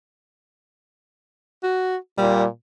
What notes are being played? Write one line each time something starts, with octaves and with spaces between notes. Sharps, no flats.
F#4
A#2 G3